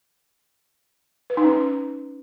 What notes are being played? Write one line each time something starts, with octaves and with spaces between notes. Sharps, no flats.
B4
D#4
C#4